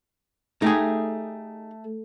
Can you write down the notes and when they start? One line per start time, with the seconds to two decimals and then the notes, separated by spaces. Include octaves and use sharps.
0.62 A3 D#4 G4 G#4